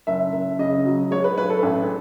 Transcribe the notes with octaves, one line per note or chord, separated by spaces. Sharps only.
F#1 E5
F#1
C#3 D#5
F#3
G#3 C#5
B4
B1 B4
A4
A1